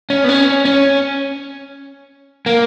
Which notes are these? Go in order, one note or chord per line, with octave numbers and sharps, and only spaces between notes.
C#4
B3
C#4
C#4
A#3